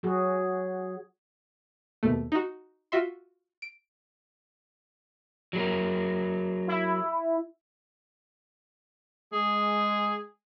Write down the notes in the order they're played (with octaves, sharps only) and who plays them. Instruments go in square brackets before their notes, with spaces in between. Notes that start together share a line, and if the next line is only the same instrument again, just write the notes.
[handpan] F#3 F#4 G#4
[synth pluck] D#2 B2 A3
D#4 F#4
F4 F#4 E5 C6
D7
[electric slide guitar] F#3 G#4 A#4
[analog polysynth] E4
[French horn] G#3 [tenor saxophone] G#4